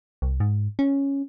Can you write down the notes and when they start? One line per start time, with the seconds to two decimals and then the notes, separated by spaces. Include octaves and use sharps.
0.22 C2
0.40 G#2
0.79 C#4